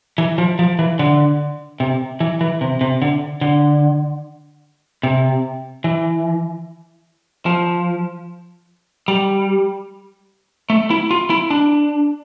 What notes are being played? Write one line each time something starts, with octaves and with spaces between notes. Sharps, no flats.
E3
F3
F3
E3
D3
C3
E3
E3
C3
C3
D3
D3
C3
E3
F3
G3
A3
E4
F4
E4
D4